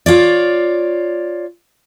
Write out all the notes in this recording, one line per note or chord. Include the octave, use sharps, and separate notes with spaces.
F4 C#5 D5